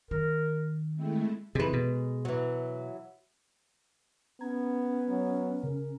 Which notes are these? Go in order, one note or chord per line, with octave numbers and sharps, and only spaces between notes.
D#3 A#4
G#3 A3 C4 E4
C3 E3 G#3 B4
B2
E3 F#3
B3 C#4 A#5 G#6
F#3
C#3 A#4